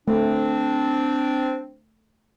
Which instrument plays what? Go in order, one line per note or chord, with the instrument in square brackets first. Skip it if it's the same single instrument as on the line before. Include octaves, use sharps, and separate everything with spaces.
[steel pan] A3 [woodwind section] C4 D4